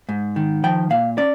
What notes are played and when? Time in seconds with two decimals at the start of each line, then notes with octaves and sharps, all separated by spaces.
0.09 G#2
0.36 D#3
0.64 F3 G5
0.90 A#2 F5
1.18 C#4 D5